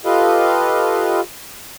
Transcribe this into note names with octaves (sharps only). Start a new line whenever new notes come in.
F4 G4 A4 B4 D#5 F5